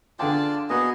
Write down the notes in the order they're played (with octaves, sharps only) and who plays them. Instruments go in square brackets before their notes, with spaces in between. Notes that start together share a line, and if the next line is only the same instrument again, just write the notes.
[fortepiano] D3 G#4 G5 [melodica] F4 D5 A5
[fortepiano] A#3 B3 F#4 [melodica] G#4 D#5